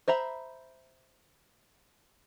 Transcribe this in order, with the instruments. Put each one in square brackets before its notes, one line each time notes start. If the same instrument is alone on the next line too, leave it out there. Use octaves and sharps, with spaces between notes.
[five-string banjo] C5 E5 A#5 B5